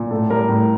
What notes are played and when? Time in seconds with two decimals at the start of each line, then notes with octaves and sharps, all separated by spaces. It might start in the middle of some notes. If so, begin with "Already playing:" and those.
Already playing: A#2
0.11 A2 A4
0.30 G3 A#4
0.49 A2